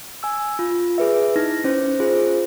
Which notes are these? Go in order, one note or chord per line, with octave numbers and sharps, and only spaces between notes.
G#5 E6
F4
G#4 B4 E5
D#4 E4 A#6
C#4 C5
F4 G#4 C5